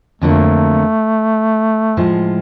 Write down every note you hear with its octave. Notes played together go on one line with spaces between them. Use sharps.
F2 D3 F#3 A3 A#3
A2 F3 G#3